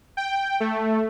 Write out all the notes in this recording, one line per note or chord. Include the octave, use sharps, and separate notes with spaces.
G5
A3